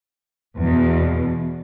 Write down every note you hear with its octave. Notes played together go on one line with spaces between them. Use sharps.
E2 B2